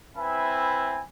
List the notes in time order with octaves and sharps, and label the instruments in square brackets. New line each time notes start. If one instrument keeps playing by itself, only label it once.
[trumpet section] C4 E4 B4 E5 G#5 B5